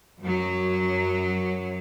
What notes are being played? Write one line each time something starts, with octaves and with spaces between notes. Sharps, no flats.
F#2 F#3